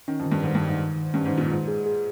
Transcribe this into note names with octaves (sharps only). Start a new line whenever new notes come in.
D#3 C#4
F2
D#3
G2
G#2 D#3
G2
D#3
G#2
D#3
D#3
G2 C#4
G#2
D#3
A#2
G#2 G#3
G#4
G#4